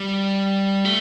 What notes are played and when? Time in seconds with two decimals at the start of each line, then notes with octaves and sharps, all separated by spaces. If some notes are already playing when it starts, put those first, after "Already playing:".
Already playing: G3
0.85 A3